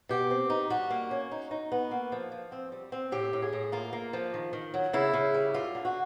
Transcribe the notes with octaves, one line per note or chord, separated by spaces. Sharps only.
B2 G4
C4
D#4
G3 F#4
A#3
C#4
D#4
D#4
B3
A#3
F3
F3
C4
G3
C4
A2 G4
A2
G#4
A2
A#3 F4
A#3
F3
D#3
D#3
F#3
C#3 E4
C#3
G3
F#2 F4
D3
F#4